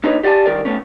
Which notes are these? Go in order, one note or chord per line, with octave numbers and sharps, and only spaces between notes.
A#3 D4 D#4 B4 C#5 D#5
G4 D5 F5 F#5 G#5 A5
G2 D#3 A#4 D5
A3 B3 C#4